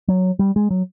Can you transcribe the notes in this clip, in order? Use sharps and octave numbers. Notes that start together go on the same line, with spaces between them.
F#3
G3
G#3
F#3